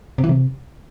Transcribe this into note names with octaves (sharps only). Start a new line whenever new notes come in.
C3
E3
C3